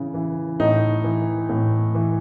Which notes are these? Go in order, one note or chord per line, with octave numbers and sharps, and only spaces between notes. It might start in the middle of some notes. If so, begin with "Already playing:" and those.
Already playing: C#3 E3
E3
A2 D#4
E3
A2
E3